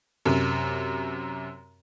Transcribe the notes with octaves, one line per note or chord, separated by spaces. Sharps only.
F#2 C3